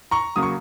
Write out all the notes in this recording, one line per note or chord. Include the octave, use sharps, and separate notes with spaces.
A#5 C#6
C#3 F#3 A#3 D#6
C#6